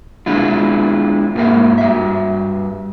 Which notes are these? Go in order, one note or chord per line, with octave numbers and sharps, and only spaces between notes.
G#3 D4 E4 F4
G#2 A#3 G#4 E5
G2 E5